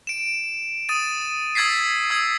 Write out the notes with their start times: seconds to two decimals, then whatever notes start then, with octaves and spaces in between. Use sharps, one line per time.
0.07 D7 E7
0.89 D#6 A6 D#7
1.55 D#6 E6 G#6 A6 B6 C7
2.10 D#6 E6 G#6